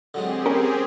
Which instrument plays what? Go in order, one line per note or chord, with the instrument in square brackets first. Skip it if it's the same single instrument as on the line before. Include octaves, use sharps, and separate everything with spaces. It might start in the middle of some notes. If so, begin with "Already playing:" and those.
[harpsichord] D3 F#3 G#3 [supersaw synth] C4 G4 G#4
[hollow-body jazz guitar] C#4 A#4